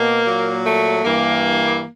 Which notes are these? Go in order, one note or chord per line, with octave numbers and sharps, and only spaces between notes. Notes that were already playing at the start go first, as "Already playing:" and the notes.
Already playing: B2 A#3
A#2 F#3
A3
G2 E3 A#3